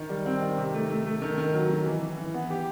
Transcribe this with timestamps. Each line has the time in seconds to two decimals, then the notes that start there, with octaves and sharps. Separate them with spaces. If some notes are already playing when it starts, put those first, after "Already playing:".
Already playing: D#3
0.09 G3
0.26 C4
0.42 D#3
0.58 C3
0.74 A3
0.90 A3
1.06 A3
1.22 D#3
1.38 D#3
1.54 F#3
1.69 F#3
1.86 E3
2.02 E3
2.18 E3
2.34 B3
2.50 G4